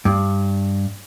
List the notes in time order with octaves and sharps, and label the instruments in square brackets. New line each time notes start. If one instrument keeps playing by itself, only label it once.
[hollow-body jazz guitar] G2